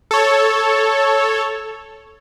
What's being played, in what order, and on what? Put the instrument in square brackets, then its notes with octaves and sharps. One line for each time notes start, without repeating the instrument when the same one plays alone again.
[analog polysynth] A4 C#5